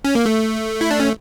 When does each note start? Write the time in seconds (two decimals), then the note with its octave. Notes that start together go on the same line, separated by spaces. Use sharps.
0.05 C#4
0.15 A#3
0.26 A3
0.81 E4
0.91 D4
1.00 C#4